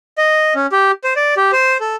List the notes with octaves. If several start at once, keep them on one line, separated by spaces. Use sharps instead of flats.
D#5
C#4
G4
C5
D5
G4
C5
A4